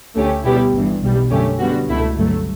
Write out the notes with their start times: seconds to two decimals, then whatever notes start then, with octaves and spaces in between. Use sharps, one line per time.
0.16 D2 D3 A3 C#4 G4
0.45 B2 G3 B3 E4 G4
0.73 G1 G2 E3
1.02 B1 B2 G3
1.31 F#2 D3 A3 C#4 G4
1.60 D3 G3 B3 F#4
1.89 C#2 B2 A3 E4
2.17 G1 G2 F#3 A3